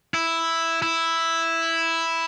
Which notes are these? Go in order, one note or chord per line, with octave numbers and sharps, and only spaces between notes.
E4
E4